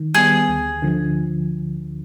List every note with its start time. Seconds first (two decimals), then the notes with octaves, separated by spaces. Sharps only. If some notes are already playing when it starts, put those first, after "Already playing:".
Already playing: D#3
0.14 G3 B3 G#4
0.48 D2
0.82 D3 F3